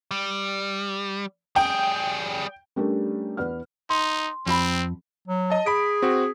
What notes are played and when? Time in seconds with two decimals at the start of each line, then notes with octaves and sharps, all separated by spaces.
0.11 G3
1.56 G3 G#4 G5
2.76 G3 A3 C#4 D4 G4 A#4
3.37 E2 B4 D5 F#5 F6
3.90 D#4 C6
4.46 F2 C4 F#4 B5
5.28 F#3
5.50 D#5 A5
5.66 G#4 B5 B6 D7
6.02 C4 F#4